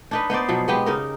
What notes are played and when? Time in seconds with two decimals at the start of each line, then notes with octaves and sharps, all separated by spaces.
0.11 D4 D#4 B4
0.30 B3 D#4 C5 D5
0.48 B2 F3 F#3
0.68 G#3 B3 G4
0.86 C#3 D#4 A#4